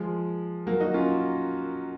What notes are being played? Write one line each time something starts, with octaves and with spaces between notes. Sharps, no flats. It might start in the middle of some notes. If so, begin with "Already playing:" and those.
Already playing: F3 G#3
F#3 A#3
D#4 F#4
C#4 F4